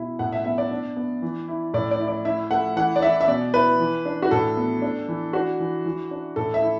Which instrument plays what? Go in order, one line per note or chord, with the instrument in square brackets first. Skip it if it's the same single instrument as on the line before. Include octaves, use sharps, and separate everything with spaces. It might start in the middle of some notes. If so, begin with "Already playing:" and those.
Already playing: [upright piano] B2 E4
A2 F#5
E5
B3 E5
D5
D4
B3
E3
E4
A2 D5
D5
E4
D5
E4 E5
A3 F#5
E3 F#5
D5
E4 E5
E5
B2 D5
E4 B4
E3
D4
F#4
A2 A4
B3
D4
E3
D4 F#4
E3
E3
D4
A2 A4
E5
E4